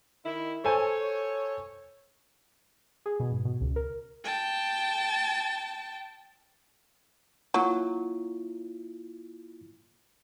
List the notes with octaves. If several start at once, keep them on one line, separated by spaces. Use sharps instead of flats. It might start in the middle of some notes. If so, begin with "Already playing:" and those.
D#3 E4
A4 C5 C#5 G#5
G#4
B2
G#2
B2
C#2
A#4
G5 A5
F#3 A#3 E4 F4